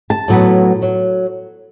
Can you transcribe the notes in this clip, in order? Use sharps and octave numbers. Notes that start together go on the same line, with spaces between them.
A5
A2 F#3 B3
F#3